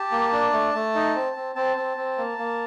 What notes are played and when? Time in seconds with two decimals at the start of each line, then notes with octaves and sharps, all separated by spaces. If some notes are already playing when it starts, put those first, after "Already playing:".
Already playing: G4 A5
0.12 A#3
0.33 D4
0.53 A3
0.74 A3
0.95 D#4
1.15 C4
1.36 C4
1.55 C4 A5
1.76 C4
1.97 C4
2.18 A#3
2.38 A#3